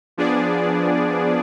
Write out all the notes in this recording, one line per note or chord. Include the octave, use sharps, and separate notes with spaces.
F3 B3 D4 G#4 D5